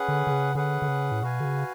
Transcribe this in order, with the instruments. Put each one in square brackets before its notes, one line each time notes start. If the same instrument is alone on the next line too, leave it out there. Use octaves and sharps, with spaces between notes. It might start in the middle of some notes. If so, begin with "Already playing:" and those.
Already playing: [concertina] C#4 G#4 B4 F#5
[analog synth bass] D3
D3
C#3
[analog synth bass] D3 [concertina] C#4 G#4 B4 F#5
[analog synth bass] D3
C#3
A2
[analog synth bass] B2 [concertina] F#4 B4 F5 G#5
[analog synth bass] D3
C#3